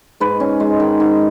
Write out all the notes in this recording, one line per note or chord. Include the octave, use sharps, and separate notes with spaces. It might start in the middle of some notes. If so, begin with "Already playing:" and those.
G#2 B4
C#4
G#3
D#3
G#2